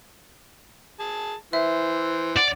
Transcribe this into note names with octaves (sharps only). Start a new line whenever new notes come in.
G#4 A5
E3 C5 E5
D5 F#5